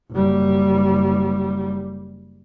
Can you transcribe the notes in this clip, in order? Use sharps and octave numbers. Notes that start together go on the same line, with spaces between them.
F#1 G3